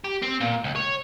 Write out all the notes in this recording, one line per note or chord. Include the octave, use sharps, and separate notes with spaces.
G4
C4
A#2
C#2
C#5